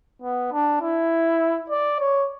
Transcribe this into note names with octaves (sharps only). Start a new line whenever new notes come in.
B3
D4
E4
D5
C#5